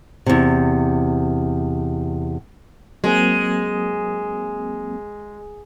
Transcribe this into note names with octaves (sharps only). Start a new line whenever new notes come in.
E2 C3
F#3 G#3 A#3 C4